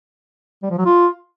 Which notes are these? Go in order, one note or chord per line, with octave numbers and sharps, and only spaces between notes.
G3
F3
F#3
F4